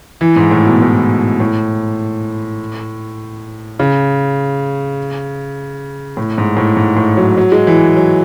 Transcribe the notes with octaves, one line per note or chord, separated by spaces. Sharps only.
E3
G#2
A2
B2
A2
A2
C#3
A2
G#2
A2
G#2
A2
F#3
F#3
G#3
E3
F#3